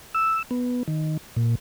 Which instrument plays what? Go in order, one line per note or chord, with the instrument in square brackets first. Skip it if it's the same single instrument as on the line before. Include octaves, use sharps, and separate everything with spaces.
[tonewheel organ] E6
B3
D#3
A#2